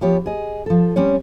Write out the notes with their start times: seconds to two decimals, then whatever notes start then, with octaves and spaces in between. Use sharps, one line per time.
0.01 F3 B3 G4 C#5
0.26 G#4 D#5
0.66 F3 A4
0.96 G3 C4 C#4 C#5